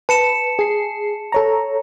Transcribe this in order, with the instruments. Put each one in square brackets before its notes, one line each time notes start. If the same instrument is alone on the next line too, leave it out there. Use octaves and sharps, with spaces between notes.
[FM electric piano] B4 [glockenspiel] A5 C#7 E7
[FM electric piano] G#4 C7
A4 C#5 A#5